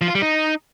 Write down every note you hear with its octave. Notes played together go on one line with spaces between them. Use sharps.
F3
F4
G3
D#4